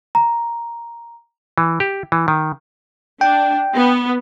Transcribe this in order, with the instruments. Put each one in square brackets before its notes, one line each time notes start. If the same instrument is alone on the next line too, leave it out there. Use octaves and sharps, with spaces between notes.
[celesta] A#5
[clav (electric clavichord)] E3
G4
E3
D#3
[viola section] D4 [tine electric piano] G5
[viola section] B3